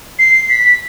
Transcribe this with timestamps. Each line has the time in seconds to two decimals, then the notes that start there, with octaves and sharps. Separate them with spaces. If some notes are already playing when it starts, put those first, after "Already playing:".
0.19 C7
0.49 B6